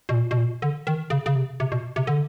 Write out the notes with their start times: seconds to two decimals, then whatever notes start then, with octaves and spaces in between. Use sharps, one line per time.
0.09 B2
0.14 A#2
0.31 B2
0.37 A#2
0.62 D3
0.87 D#3
1.10 C#3
1.26 C#3
1.35 C3
1.60 C3
1.72 B2
1.96 C3
2.07 D3